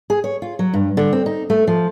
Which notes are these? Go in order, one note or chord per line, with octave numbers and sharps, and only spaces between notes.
G#4
C#5
F4
F#3
G2
D3
C4
D#4
A3
F3